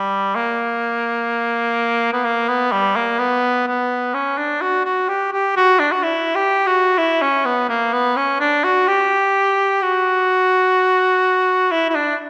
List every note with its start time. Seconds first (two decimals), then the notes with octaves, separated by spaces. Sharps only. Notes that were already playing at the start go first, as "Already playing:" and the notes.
Already playing: G3
0.36 A#3
2.13 B3
2.25 A#3
2.48 B3
2.72 G3
2.96 A#3
3.19 B3
3.67 B3
4.14 C#4
4.38 D4
4.62 F#4
4.85 F#4
5.09 G4
5.32 G4
5.57 F#4
5.80 D4
5.92 F#4
6.03 E4
6.35 G4
6.67 F#4
6.98 E4
7.22 C#4
7.46 B3
7.69 A#3
7.93 B3
8.17 C#4
8.40 D4
8.64 F#4
8.88 G4
9.82 F#4
11.72 E4
11.90 E4
11.95 D4